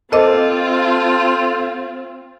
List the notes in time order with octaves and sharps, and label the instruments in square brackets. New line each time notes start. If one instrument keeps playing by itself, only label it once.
[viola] C4 [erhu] F4 [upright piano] A4 [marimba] C5 D#5 D6